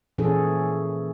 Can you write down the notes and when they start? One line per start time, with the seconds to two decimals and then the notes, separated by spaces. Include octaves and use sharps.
0.18 A#2 E3 C#4 G#4 A4